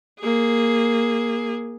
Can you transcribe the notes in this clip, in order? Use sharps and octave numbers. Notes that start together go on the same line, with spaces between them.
A#3 G#4